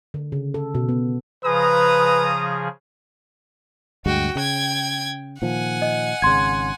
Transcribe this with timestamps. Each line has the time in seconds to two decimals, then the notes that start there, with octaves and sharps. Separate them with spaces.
0.14 D3
0.32 C#3
0.54 A4
0.75 B2
0.89 B3
1.44 C#3 F3 G#4 B4 A#5 D#6
4.06 D2 G2 G#3 F#4 G5
4.35 C#3 G5 G#6
5.42 A#2 D#3 F3 F#5 G#5
5.82 D#5
6.22 G#1 C#3 C6 G#6